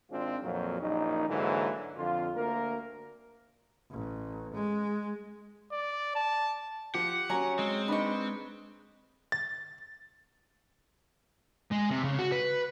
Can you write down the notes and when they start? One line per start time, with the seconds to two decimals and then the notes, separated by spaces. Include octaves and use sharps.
0.11 G#1 G#3 C4 D4 F4
0.43 F2 A#2 F#3
0.81 A#1 F#2 D#4
1.29 G#2 D3 E3 F#3 A#3
1.97 F2 D3 F4
2.35 D2 A#3 A#4
3.91 A1
4.54 G#3
5.72 D5
6.15 A5
6.95 F3 G4 F#5
7.29 F#3 C#4 C#5 G#5 A#5
7.59 G#3 C4
7.88 D4 D#4 B4 D#5 C#6
9.32 A6
11.71 G#3
11.90 C3
12.04 C#3
12.18 F#4
12.32 B4